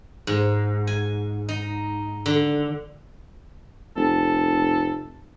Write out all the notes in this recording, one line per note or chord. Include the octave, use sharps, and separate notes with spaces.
G#2
G#5
D#4
D3
F1 A4